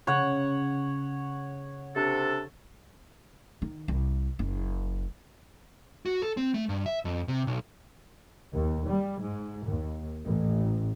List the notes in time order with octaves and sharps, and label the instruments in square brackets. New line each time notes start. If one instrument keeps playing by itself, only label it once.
[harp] C#3 [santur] C#5 F#5
[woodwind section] C3 D4 A4
[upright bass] D#3
C2
F#1
[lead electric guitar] F#4
A4
C4
A3
G2
E5
F2
C3
B1
[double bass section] D#2
G3
G#2
D#2
A1